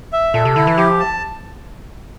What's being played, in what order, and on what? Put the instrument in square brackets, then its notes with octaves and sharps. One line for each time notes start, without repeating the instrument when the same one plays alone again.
[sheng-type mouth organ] E5
[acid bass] A#2 [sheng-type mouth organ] A4
[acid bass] C3
[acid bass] D3 [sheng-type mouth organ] E4
[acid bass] E3
[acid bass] F3 [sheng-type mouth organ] G4
[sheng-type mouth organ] A5